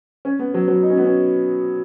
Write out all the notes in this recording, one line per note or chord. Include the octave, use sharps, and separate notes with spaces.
C#4
B3
F#3
F#3
D#4
C#4
B3
C#4